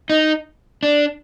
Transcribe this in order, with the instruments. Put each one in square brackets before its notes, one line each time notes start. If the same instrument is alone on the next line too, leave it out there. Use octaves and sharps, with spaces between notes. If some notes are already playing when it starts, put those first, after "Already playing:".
[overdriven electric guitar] D#4 [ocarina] D#5
[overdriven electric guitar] D4 [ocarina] D5